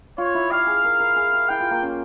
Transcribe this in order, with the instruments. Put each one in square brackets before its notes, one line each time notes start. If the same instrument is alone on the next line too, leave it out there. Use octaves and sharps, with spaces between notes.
[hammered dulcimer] F4 [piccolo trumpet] C#5
[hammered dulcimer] E4
[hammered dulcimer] G4 [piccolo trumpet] F5
[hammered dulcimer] G#4
A#4
A#4
G#4
G4
[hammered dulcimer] E4 [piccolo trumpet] G5
[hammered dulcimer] F4
A#3
C#4